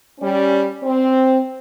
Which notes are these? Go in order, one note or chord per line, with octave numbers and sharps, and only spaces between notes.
G3 C#4
C4